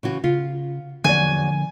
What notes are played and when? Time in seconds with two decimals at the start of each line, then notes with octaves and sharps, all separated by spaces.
0.03 C#3 E3 F#4
0.24 C#3 F4
1.04 E2 D3 F3 F#3 A#3 D5 G#5